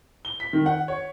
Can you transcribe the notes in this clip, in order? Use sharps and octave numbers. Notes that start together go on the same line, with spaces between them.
G7
B6
D#3
F#5
C#5